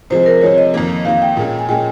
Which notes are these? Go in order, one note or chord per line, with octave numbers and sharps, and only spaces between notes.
C3 F3 G#3 C5
A#4
C3 F3 G#3 C#5
D#5
F2 D#3 A#3
F2 D#3 A#3 F5
G5
A#2 G#3 C#4
G#5
A#2 G#3 C#4 G5